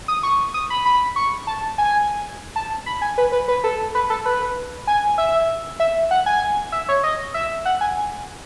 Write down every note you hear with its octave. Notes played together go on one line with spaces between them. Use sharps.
D#6
C#6
D#6
B5
B5
C#6
A5
G#5
A5
B5
G#5
B4
B4
B4
A4
B4
A4
B4
G#5
E5
E5
F#5
G#5
E5
C#5
D#5
E5
F#5
G#5